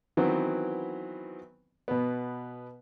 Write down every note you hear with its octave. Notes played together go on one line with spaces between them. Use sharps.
D#3 E3 F#3 B3 C4
B2 B3